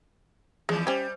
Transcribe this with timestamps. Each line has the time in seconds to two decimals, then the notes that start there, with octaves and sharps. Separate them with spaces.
0.69 D#2 E3 F3 G#3
0.87 G3 C#4 G4 C5